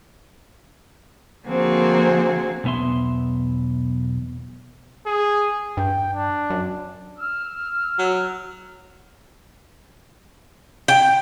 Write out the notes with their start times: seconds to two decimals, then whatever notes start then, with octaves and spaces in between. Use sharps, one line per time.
1.46 D3 F3 A#3 C4 F#4 G#4
2.64 B1 E2 B3 E5 C6
5.07 G#4
5.77 G2 G5
6.13 D4
6.50 F#2
7.18 E6 F6
7.99 F#3
10.88 G5